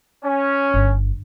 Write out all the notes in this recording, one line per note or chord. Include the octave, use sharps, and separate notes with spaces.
C#4
G1